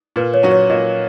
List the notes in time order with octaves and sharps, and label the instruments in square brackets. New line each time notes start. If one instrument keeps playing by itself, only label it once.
[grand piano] A#2 [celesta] B4
[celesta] C#5
[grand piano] F#3 C#4 F#4
[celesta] C#5
[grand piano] A#2 [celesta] D#5